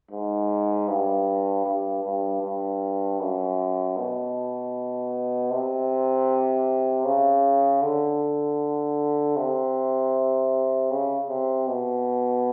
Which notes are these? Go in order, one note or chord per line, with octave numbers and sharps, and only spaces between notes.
G#2
G2
G2
G2
G2
F#2
B2
C3
C#3
D3
C3
C#3
C3
B2